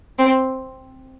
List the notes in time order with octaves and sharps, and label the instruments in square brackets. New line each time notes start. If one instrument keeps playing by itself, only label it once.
[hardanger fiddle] C4